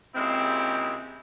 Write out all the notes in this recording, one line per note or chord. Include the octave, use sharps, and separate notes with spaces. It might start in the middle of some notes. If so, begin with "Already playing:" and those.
A#2 C#3 G#3 C4 E4 G4